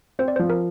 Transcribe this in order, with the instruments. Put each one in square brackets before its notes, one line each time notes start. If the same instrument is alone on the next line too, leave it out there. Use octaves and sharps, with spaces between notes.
[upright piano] C4 [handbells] C5
[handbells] D5
[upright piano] F3 [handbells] C5
[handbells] A#4